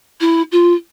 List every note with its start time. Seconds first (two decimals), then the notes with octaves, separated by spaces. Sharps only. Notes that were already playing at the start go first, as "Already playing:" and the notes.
0.21 E4
0.52 F4